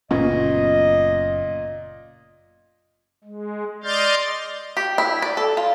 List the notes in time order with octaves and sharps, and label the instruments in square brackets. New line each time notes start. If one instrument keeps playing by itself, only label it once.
[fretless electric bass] F#1 B3 C#4 [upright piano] A#2 [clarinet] D#5
[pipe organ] G#3
D5 D#5 C6 F6 G6 A6
[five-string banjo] G4
E4
D5
A4
F4